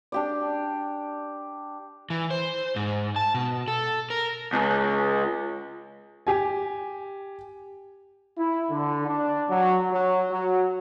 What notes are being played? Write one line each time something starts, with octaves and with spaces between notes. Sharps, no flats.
D4 G4 D5
E3
C5
G#2
A5
B2
A4
A#4
C#2
G4 G#5
E4
D3
D4
F#3
F#3
F#3